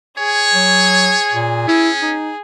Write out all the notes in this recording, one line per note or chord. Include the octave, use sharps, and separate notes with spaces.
G#4 C#5
F#3
A#2
C#4 E4
D#4